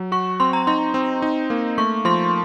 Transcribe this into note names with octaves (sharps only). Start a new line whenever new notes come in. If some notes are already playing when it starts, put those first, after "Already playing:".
Already playing: F#3
F#4 C#6
C4 C6
A#5
D#4 C6
C4
D#4
A#3
A3 C#6
F3 C6